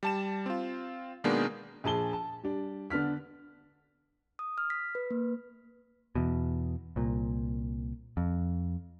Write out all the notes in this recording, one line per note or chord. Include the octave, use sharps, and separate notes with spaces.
G3 A5 E7
C4 F4
B2 D#3 G#3 A#3 B3 D4
A#1 G#4 A5 G7
A5
G3 D4
D3 B3 D4 F6 B6
D#6
F6
B6
B4
A#3
E2 B2
C2 A#2
F2